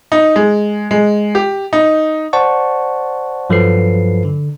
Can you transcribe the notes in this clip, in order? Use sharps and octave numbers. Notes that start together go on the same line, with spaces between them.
D#4
G#3
G#3
G4
D#4
C5 D5 F#5 A5 C#6
G2 F3 F#3 A4 B4 C7
D3